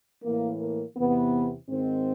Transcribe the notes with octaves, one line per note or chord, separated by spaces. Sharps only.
A2 E3 A#3
A#3
E2 C3 E3 B3
G#2 D#3 C4